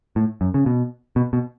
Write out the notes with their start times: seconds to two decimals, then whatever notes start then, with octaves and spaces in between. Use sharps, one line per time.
0.16 A2
0.41 F#2
0.54 C#3
0.66 B2
1.16 B2
1.33 B2